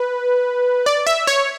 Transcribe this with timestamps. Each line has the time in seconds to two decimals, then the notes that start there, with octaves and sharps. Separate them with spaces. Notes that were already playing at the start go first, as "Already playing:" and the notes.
Already playing: B4
0.86 D5
1.07 E5
1.27 C#5